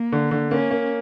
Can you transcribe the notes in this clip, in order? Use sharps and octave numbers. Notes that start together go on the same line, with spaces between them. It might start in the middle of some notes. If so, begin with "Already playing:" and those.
Already playing: A#3
D3
D3
A#3 C#4
A#3